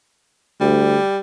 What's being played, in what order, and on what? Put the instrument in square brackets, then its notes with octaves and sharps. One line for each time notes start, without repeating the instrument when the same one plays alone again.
[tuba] D2 [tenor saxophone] G3